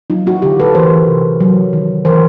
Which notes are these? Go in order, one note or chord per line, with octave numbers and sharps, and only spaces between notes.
F#3 D#4 F4
E4 F#4
D3 F4 G4
A4 B4
E3 A#4 C5
C3
F#3
D#3
E3 A#4 C5